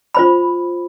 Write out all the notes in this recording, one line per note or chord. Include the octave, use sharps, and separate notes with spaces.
F4 C5 B5